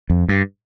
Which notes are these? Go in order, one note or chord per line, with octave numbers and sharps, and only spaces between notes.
F2
G2